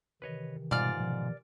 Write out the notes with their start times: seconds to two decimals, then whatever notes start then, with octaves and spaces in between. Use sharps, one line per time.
0.22 C3 D#3 E3 B4 C#5 D#5
0.71 G#2 B2 G3 F4 D5 F6
1.00 B2 F3